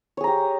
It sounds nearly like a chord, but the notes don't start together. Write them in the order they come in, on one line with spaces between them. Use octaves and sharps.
C#5 G#4 A#5 G4